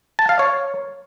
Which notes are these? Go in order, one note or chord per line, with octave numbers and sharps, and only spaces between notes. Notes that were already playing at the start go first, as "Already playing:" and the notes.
A5
F5
C#5